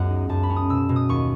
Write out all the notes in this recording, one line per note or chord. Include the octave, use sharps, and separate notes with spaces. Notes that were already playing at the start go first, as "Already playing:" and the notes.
Already playing: C#2 F#2 G#3 B3 F#5
D#4
F#2 A5
B5
C#4
D#6
B2 E6
B2
D#6
D#2 C#6